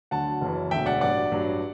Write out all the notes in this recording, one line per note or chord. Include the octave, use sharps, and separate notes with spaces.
D2 D3 F#3 F#5 A5
F#1 F#2 E3
E1 D2 D3 F#3 E5 G5
D5 F#5
A1 G2 F#3 D5 F#5
A1 G2 F#3